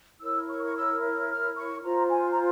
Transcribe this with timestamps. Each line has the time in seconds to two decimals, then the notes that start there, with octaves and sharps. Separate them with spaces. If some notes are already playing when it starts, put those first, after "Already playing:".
0.20 E4 A#4 C#5 E6
0.48 C#6
0.63 C#6
0.75 E6
1.29 F6
1.56 C#6
1.83 F4 C5 A#5
2.10 G#5
2.30 A#5